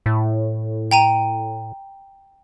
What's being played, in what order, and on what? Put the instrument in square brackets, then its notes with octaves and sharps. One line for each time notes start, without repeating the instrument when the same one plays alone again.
[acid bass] A2
[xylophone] G5 A#5 D#7